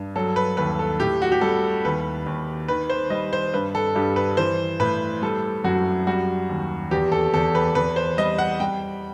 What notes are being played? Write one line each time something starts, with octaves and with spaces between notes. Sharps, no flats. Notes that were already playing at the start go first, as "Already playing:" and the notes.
Already playing: G2
F#3 A4
B4
D#2 B4
A4
A2 G4
F#4
G4
G3 A4
D#2 B4
D#2
D#3 B4
C5
G3 D#5
C5
G2 B4
A4
G2 G4
B4
E3 C5
A2 B4
G3 A4
F#2 F#4
G3 F#4
D#2
E2 G4
A4
E2 A4
B4
E2 B4
C5
G3 D#5
F#5
G3 G5